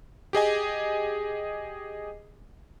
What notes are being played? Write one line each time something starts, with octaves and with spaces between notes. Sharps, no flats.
G4 G#4 D#5 G#5